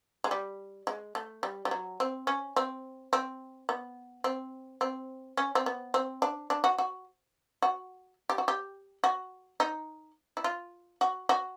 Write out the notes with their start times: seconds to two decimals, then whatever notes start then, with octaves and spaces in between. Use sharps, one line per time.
0.24 G#3
0.31 G3
0.87 G#3
1.15 A3
1.43 G3
1.65 G3
1.71 F#3
2.00 C4
2.27 C#4
2.56 C4
3.13 C4
3.69 B3
4.24 C4
4.81 C4
5.37 C#4
5.55 C4
5.66 B3
5.94 C4
6.22 D4
6.50 D4
6.64 F#4
6.78 F#4
7.62 F#4
8.29 G4
8.38 F#4
8.48 G4
9.04 F#4
9.60 D#4
10.37 E4
10.44 F4
11.01 F#4
11.29 F#4